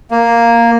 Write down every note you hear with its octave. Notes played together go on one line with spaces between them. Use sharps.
A#3